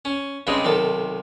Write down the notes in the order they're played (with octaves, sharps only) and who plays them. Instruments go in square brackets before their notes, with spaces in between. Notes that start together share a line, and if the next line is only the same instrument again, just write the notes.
[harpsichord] C#4
G2 C#3 G3 G#3 C4 D#4
B1 C3 D#3 A4